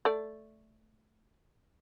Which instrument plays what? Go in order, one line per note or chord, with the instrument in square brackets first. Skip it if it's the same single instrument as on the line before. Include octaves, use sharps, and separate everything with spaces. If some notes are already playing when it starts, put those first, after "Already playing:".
[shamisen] A3 D5